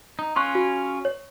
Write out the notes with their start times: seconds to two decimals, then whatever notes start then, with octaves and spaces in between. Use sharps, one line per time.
0.19 D#4
0.36 C#4 F4 G#4 C6 C#6 F#6
0.55 F#4
1.05 C#5